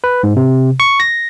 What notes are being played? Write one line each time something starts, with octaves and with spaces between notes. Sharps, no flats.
B4
G#2
C3
C#6
A#6